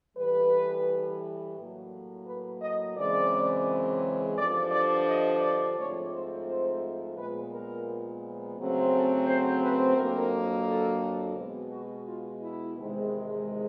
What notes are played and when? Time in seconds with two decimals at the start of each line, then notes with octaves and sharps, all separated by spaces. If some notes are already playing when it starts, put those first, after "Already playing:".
0.16 A2 E3 G3 B4
1.57 A2 F#3 A#3
2.26 B4
2.62 D#5
2.96 F#2 C#3 E3 G#3 C4 D5
4.37 G2 D3 F3 D5
4.72 D5
5.06 D#5
5.42 D5
5.77 G#2 F3 A3 C4 C#5
6.12 C5
6.46 C5
7.16 A#2 F3 G#3 B3 B4
7.52 A#4
8.57 C#3 F#3 A3 C4
8.92 A4
9.27 C5
9.62 B4
9.96 F2 D3 F#3 A#3 A#4
10.67 A4
11.37 B2 G#3 B3
11.71 F#4
12.07 F4
12.41 E4
12.77 E2 C3 D#3 G#3 C4